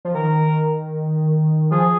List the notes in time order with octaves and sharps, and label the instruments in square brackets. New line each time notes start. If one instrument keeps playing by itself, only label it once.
[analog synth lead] F3
[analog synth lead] D#3 [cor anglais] A#4
[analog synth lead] F3 [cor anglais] G#4